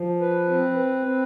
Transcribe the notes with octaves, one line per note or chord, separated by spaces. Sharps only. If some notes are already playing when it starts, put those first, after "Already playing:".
Already playing: F3
B4
C4
B4
C4